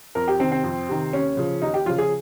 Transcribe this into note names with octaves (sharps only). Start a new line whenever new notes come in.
F2 A#4
G4
C3 D#3 C4
C4
F2
C3 D#3
D#2 C#4
C#3 F3
D#2 D#4
G4
C#3 F3 F4
G#4